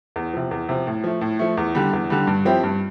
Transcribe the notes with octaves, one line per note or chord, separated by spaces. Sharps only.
E2
C3 F3
E2
C3 F3
A2
F3 A3
A2
F3 A3
E2
D3 G3
E2
D3 G3
G2
F3 C4 E4 G4
G2